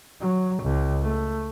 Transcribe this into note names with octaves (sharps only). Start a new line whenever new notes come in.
F#3
C#2
A3